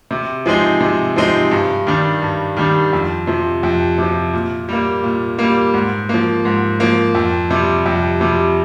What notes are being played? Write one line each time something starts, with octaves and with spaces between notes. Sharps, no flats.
C3
F3 G#3 C4 D#4
C3
F3 G#3 C4 D#4
G2
D#3 G3 D4
G2
D#3 G3 D4
F2
C3 F3
F2
C3 F3
A#2
G3 A#3
A#2
G3 A#3
G#2
F3 A#3
G#2
F3 A#3
F2
C3 G3
F2
C3 G3